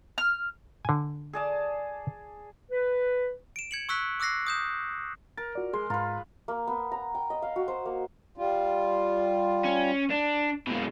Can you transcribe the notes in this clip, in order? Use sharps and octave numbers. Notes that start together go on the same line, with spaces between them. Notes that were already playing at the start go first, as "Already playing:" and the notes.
F6
D3 G#5
G#4 D5 A5
B4
D7 E7
G#6 C#7 F#7
C#6 E6 F#6 B6
D6 E6 F#6 A#6 C7
D#6 G6 E7
A#4 A6
F4 F#4 D5
G#3 G#4 C6
G#2 F4 B4 A#5
A#3
B3
A#5
G5
D#5
F5
F#4
C5
A#3
G3 F4
C#4
D4
F#2 B2 G#3 A#3